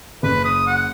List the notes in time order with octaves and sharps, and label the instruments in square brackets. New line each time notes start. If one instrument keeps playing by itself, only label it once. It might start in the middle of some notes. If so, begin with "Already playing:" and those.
[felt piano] F#1 [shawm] B4
[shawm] D#6
F#5